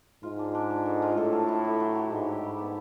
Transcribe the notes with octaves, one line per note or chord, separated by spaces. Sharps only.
G#2 F4
D4
D4
D4
A4
F4
A2 A4
A4
E4
E4
F#3
F#3
G#2 D4
G4
G3
B3